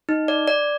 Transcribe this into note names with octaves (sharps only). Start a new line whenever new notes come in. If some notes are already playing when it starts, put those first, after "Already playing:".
D#4
D5
D5